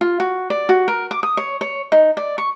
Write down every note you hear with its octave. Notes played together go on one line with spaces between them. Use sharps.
F4
F#4
D5
F#4
A#4
D6
D#6
C#5
C#5
D#4
D5
C#6